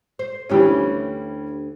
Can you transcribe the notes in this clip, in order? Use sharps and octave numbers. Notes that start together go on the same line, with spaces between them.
C5
D2 E3 G3 C#4 D4 G4